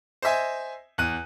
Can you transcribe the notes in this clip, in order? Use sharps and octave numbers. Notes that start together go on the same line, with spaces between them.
C5 D#5 E5 G#5
E2 F#6 D#7